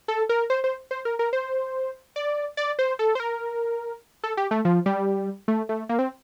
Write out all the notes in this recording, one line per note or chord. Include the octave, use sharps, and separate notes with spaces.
A4
A#4
C5
C5
C5
A#4
A#4
C5
D5
D5
C5
A4
C5
A#4
A4
G4
A3
F3
G3
A3
A3
A#3
C4